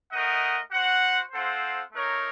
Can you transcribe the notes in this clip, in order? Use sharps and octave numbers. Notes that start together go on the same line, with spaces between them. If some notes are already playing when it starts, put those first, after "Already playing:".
A3 D#4 A#4 D#5 F#5
F#4 C5 F#5
C4 F4 A4 C5 F#5
A3 D#4 A#4 C#5